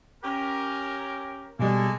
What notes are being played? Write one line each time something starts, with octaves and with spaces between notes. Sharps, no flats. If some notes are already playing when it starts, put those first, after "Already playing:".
C#4 G4 A#4
B2 G3 G#3 A#3 A4